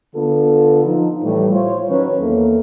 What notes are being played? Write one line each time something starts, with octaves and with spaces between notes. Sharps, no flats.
D3 B3 F4 A4
F3 D#4
A2 E3 G3
F4 C5 C#5
D#3 F#3 C#4 B4 C#5
E2 E3 A#3 A4 A#4